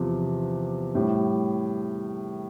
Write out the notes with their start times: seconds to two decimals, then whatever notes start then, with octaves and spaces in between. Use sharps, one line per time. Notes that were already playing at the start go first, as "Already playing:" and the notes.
Already playing: E2 C3 F3
0.95 A2 G3